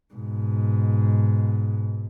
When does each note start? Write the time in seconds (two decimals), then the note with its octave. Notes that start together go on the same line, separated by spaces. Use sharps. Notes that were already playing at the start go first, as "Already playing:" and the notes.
0.14 G#2 B2